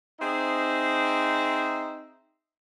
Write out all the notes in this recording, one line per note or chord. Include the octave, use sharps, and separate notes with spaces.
C4 D#4 G#4 C5 E5